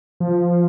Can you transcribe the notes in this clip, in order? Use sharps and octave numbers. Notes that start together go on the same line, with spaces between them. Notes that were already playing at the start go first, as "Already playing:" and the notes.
F3